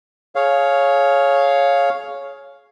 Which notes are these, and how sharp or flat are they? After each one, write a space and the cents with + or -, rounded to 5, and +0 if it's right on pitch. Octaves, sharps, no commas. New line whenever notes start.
G#4 +25 C#5 +0 F5 +0